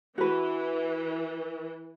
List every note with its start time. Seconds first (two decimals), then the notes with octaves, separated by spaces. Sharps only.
0.18 E3 F#4 B4